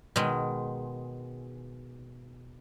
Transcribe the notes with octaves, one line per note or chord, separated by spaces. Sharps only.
B2 D#3 G#3